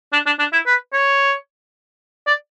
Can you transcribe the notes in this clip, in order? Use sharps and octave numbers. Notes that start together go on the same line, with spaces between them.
D4
D4
D4
E4
B4
C#5
D5